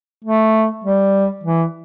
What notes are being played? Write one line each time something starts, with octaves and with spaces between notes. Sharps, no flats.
A3
G3
E3